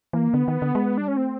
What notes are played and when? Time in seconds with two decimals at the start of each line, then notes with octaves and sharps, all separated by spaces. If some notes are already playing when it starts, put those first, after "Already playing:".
0.13 E3 A#3
0.34 D3 B3
0.48 D#3
0.62 D3
0.75 G#3
0.98 G3 D4
1.08 G#3 C#4
1.17 A3 C4